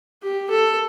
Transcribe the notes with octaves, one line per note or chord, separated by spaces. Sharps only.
G4
A4